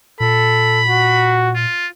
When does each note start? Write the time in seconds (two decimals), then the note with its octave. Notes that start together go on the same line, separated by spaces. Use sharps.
0.20 A#2 A4 B5
0.88 F#4
1.55 F4